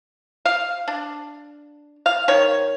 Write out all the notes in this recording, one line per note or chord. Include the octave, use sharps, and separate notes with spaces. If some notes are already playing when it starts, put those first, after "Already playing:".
F5
D4
F5
D#3 C#5